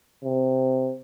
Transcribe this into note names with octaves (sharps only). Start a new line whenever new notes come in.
C3